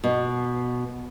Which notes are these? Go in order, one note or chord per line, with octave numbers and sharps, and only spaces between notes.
B2